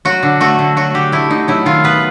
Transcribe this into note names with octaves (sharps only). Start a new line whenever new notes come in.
F#3 F#4
D3
A3 F#4
D3
F#3 F#4
D3 G4
A3 E4
D3 D#4
F#3 E4
D#3 F4
B3 B4